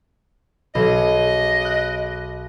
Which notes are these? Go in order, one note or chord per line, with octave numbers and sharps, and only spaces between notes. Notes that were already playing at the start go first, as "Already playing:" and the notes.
B1 G#4 D#5
F#6 D7